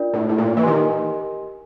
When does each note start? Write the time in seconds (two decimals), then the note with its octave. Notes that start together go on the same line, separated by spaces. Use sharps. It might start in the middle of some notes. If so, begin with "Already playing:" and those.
Already playing: D4 F4 A#4 D5
0.14 A2
0.29 A2
0.38 A#2
0.57 E3
0.63 D#3 G4 A#4 D#5 G#5 C6